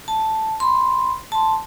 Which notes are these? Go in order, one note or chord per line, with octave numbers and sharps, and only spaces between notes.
A5
B5 C6
A5 C6